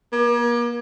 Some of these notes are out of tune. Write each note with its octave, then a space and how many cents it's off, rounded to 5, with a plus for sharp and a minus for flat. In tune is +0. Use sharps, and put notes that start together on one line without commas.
A#3 +40